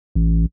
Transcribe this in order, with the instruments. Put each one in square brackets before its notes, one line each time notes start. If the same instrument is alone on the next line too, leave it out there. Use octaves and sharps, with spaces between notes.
[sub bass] A1